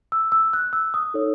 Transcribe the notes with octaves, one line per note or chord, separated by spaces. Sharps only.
E6
E6
F#6
E6
D#6
D#4 A4 C#5